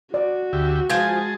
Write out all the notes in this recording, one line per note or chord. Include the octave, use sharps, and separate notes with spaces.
F#4 D5
D2 G4 E5
F3 G#3 G#4 G#5 A5